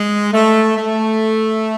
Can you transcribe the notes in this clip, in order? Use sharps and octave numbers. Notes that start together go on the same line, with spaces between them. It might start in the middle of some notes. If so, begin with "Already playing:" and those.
Already playing: G#3
A3
A3